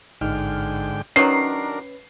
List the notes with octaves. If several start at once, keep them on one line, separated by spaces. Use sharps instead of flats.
A1 G#2 D3 D#4 G5 F6
D#3 F#3 C#4 D4 A#4 B4 C7